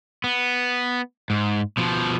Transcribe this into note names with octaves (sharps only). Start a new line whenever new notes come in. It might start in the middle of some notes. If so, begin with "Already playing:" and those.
B3
G#2
B2 F3